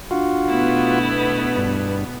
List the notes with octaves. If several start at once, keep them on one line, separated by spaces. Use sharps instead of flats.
D4 F4 F#4
B2 A3 B3 E4
G2